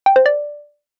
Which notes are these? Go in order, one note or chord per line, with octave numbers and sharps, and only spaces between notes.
G5
C5
D5